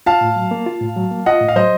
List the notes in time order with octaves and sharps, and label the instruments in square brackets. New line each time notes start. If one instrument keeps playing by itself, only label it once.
[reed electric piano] F4 [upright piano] F5 A5
[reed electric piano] A2
F#3
A#3
F4
A2
F#3
A#3
[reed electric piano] F4 [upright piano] D#5 F#5
[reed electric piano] A2
[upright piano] F5
[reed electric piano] F#3 [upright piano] C5 D#5